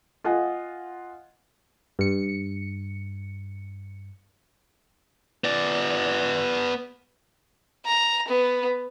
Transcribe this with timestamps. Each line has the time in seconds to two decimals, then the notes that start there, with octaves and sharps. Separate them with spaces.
0.24 F4 D#5 F#5 G#5
1.99 G2 C#7
5.44 B3 D5
7.86 A#5
8.28 B3